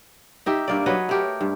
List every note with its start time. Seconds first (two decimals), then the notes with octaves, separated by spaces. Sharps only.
0.46 D#4 G4 E5
0.68 G2 A#3 D5
0.86 F#3 B4 C#5 D#5
1.09 A3 G4 A#4
1.41 G2